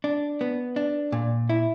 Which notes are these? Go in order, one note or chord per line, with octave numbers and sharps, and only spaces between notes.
D4
B3
D4
A#2
E4